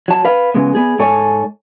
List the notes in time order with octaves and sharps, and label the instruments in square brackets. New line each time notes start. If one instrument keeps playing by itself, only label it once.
[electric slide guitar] F#3 A5
B4 F5
C#3 G#3 B3
B3 G#4
G#2 A4 C#5 G#5